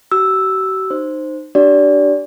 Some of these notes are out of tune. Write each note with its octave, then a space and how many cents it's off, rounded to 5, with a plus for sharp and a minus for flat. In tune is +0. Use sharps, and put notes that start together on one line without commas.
F#4 +45 E6 +0
D#4 -20 C5 +0
D4 +0 G4 -30 D5 -25